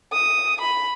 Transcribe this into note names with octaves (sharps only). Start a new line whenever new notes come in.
D#6
B5